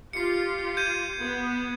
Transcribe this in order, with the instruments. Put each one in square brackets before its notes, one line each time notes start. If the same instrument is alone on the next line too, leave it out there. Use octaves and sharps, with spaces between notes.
[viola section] F4 G4 [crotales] C7 C#7
[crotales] G6 G#6 D#7
[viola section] B3